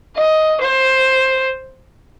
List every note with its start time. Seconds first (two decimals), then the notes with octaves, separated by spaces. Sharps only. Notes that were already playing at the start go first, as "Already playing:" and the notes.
0.16 D#5
0.61 C5